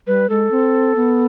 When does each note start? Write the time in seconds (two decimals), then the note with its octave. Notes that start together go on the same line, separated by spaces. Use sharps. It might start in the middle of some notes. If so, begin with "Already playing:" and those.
0.07 G3 B4
0.29 G#3 A4
0.51 C4
0.96 B3